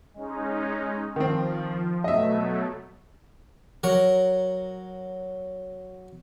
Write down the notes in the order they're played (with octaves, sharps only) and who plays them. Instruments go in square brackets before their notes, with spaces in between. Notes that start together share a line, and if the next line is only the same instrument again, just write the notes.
[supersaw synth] G#3 C#4 D#4
[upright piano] D#3 C4 [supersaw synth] F3
[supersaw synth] B2 F#3 A3 [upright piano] D#5 E5
[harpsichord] F#3 A#4 C#6